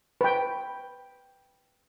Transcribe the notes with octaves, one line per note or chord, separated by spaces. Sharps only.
B4 G5